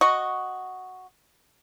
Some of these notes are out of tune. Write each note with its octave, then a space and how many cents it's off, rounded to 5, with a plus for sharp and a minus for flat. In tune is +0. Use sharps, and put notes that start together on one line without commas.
F#4 +0 D#5 +0 C#6 +0